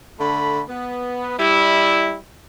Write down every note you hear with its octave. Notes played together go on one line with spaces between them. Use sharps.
D3 A3 B5
B3
G3 E4